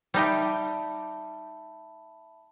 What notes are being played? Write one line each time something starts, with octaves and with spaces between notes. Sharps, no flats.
G3 D#4 G4 E5 A5 B5